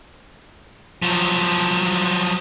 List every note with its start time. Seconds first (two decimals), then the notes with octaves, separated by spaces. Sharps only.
1.02 F3 F#3